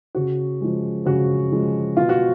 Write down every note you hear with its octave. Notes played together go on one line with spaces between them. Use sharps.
C#3 F#4
F3 G#3
C#3 F#4
F3 G#3
B2 F4
F#4